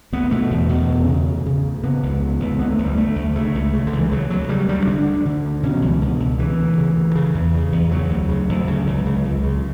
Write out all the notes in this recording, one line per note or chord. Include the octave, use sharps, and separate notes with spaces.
D2 B3
B2 A3
E2
B2
E2
C#3
D2
C#3
D2
C#3 B3
C#2
C#3
C#2
D3 B3
A3
D2
G3
D3 A3
D2
C#3 A3
C#2
C#3
D3
C#2
E3
C#3 F#3
D2 F#3
C#3 G3
D2 G3
D3 D4
D2
D3
D2
B2 C#4
F#3
C#2 E3
B2 D3
C#2
C#3 E3
D2
C#3
D2
C#3
E2
C#3
E2
C#3 F#3
D2
C#3
D2
C#3
C#2
C#3
C#2
C#3